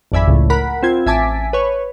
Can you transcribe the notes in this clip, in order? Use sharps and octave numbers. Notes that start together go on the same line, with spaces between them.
G#1 F2 D5 E5 G#5 B5
C#2 A2
A#4 F#5 B5
C4 F4 G#6
A1 E5 G#5 A5 D6 B6
B4 C#5